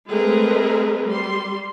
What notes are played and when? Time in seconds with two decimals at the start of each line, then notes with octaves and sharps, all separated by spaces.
0.10 G#3 A3 C4 G#4 A#4 B4
1.06 G3 C6